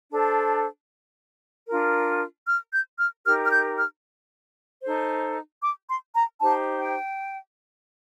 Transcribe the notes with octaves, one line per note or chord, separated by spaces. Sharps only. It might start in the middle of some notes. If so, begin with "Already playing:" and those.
D4 A4 C5
D4 F4 A#4
F6
G6
F6
D#4 G4 A#4 F6
F6
G6
F6
D#4 A4 C5
D6
C6
A#5
D#4 G4 C5 A5
G5